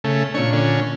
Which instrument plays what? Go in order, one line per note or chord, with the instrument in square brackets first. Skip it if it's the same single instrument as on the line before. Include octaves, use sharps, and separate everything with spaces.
[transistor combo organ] C#3 A3
[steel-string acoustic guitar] A#2 D4 [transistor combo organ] C#5
[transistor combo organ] D3 C#4